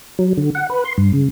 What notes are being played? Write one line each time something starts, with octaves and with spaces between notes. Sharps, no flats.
F#3
D3
F#5
B4
C6
G2
C#3